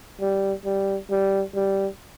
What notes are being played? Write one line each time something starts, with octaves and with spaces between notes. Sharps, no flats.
G3
G3
G3
G3